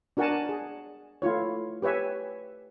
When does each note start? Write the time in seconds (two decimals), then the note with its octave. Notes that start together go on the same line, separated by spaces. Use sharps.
0.17 D4 F#4 A#4 F#5 G#5 A5
0.49 G#4
1.22 A3 E4 F4 C#5
1.82 G4 B4 C#5 E5 G#5